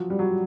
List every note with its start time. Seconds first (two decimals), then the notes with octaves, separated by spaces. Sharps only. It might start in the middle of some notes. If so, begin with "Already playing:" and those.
Already playing: F3 F#3
0.10 G3
0.19 F#3